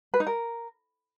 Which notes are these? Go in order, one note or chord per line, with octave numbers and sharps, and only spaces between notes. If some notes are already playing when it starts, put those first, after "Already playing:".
B4
D#4
A#4